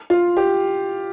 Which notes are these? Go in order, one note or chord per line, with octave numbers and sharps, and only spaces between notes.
F4
G4